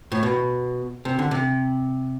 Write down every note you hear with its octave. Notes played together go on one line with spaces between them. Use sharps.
A2
B2
C3
D3
C3